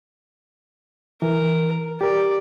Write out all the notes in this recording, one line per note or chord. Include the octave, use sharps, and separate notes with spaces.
E3 A#4
G4 A#4 D5